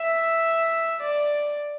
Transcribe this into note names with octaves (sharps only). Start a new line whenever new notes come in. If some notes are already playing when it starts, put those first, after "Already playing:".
Already playing: E5
D5